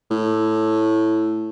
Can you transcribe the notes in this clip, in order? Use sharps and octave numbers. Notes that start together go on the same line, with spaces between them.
A2